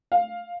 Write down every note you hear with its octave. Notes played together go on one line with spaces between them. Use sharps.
F5